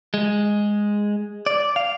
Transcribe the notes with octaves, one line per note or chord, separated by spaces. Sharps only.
G#3
D5
F5